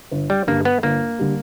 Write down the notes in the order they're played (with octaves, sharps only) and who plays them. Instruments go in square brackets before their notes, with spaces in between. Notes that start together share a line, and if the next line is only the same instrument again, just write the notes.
[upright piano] G1
[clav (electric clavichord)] G3
[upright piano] G2 D3 G3 [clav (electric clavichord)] A#3
[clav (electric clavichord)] B3
[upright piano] G1 [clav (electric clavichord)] A#3
[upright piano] D3 G3